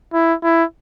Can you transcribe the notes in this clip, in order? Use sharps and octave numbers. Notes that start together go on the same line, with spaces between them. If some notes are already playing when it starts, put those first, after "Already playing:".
E4
E4